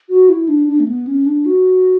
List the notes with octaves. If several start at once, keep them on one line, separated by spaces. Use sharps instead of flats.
F#4
E4
D4
D4
A3
B3
C#4
D4
F#4